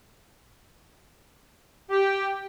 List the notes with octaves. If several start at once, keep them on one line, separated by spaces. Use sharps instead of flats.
G4